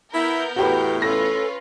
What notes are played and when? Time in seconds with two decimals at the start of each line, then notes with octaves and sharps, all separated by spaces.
0.14 B3 E4 A#4 G6
0.56 E2 A2 F#4 G4 B4
1.02 C#4 F4 A4 B4 A#6